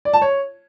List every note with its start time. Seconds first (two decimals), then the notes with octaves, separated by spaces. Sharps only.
0.05 D5
0.13 A5
0.22 C#5